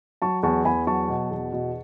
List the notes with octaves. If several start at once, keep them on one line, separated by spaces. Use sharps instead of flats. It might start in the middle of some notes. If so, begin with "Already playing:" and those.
F#3 A5 C#6
E2 A5 C#6
E2 G#5 B5
F#3 A5 C#6
B2
E2
B2